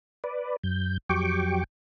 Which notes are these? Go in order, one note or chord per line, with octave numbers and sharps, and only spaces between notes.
B4 D5
F#2 G6
F2 F#3 G4 G5 C#6 D6